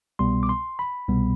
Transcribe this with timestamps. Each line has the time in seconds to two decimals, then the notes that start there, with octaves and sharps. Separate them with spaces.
0.19 C2 B2 G3 B3 C6
0.43 D6
0.49 C6
0.79 B5
1.09 C2 B2 G3 B3